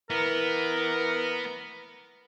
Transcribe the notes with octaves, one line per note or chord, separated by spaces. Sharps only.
E3 B3 A#4